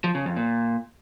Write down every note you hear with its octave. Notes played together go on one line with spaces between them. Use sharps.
F3
C#3
F2
A#2